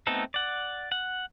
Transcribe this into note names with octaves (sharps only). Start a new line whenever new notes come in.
A3 B3 C4 D#4 A4
D5 F#5
F#5